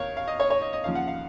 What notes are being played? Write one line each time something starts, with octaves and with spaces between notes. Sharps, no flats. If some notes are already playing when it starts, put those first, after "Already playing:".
Already playing: D#2 A#4 C#5 F5
F5
D#5
C#5
C#5
D#5
D#5
D#2 C#3 F3 F5
F#5
F5